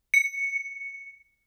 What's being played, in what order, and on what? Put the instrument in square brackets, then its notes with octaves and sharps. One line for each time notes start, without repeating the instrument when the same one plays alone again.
[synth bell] C#7